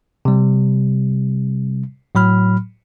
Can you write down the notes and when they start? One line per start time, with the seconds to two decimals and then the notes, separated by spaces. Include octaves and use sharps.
0.25 C3 G3
2.15 A2 F#3 B5 F6